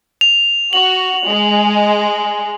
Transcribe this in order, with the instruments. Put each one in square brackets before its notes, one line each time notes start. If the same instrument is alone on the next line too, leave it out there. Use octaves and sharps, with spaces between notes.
[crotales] F7
[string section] F#4 [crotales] F#7
[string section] G#3